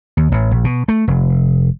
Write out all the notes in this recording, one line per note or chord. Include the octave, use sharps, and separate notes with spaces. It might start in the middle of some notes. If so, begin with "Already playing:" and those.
D#2
A1
A#1
B2
A3
F1